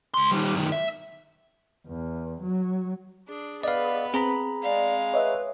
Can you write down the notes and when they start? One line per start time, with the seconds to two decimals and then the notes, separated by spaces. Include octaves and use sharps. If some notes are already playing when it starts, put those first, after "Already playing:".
0.14 C#2 C6
0.32 D#3 G3
0.55 F#2 D#3
0.72 E5
1.87 E2
2.43 F#3
3.28 D4 G#4
3.63 B3 B4 D5 D#5 F5
4.14 C4 G#4 A#5 B5
4.63 G#3 D5 F5
5.14 B4 C#5 D#5 E5